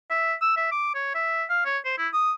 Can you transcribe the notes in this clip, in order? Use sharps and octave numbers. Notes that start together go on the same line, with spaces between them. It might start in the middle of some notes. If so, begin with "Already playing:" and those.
E5
E6
E5
D6
C#5
E5
F5
C#5
C5
E4
D#6